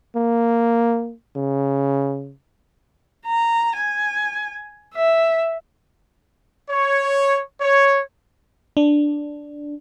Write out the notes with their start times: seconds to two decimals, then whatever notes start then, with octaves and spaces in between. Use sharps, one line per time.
0.16 A#3
1.36 C#3
3.26 A#5
3.76 G#5
4.94 E5
6.69 C#5
7.60 C#5
8.77 D4